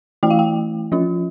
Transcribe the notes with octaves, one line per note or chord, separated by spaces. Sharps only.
E3 A3 E4 G5
F5
G5
F3 C#4 F4